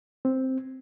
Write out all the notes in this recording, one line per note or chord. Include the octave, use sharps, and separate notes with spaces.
C4